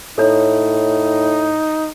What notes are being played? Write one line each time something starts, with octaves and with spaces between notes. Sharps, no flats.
A2 D#4 A4 C#5